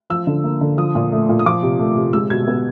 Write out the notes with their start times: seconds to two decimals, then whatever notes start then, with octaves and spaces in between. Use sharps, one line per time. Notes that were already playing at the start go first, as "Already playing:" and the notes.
0.10 F3 E6
0.27 D3
0.44 A#3
0.61 D3
0.77 F3 D#6
0.95 A#2
1.12 A3
1.29 A#2
1.39 D#6
1.45 F3 D6
1.63 C3
1.79 A3
1.96 C3
2.13 G#3 E6
2.30 B2 G#6
2.48 B3